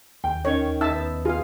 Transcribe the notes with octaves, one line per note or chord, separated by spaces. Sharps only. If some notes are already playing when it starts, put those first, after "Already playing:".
D#2 G5
D#3 C#4 C#5
D#4 E5 A5 E6
B3
F4 G#4 F5